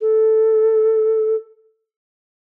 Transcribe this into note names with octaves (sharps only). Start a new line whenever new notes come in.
A4